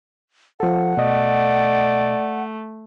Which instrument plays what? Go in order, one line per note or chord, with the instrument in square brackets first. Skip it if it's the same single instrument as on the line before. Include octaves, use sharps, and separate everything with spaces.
[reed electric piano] F3 A4 [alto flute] F#5
[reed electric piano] B2 D#5 [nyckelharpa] A3 [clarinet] D5